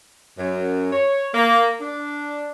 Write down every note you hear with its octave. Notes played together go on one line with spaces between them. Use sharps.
F#2
C#5
A#3
D4